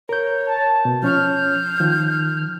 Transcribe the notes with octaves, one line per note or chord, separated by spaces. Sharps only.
A#4 C#5 G6
A5
B2
F3 C#4 C#5 F6 G6
D#3 F3